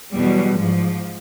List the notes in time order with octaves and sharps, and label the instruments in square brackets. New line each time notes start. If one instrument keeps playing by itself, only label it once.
[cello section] E2 B2 F#3 G3
G#2 F3